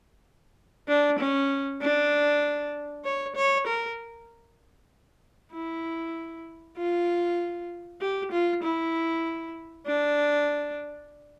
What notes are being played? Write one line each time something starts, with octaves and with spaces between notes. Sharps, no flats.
D4
C#4
D4
C#5
C#5
A#4
E4
F4
G4
F4
E4
D4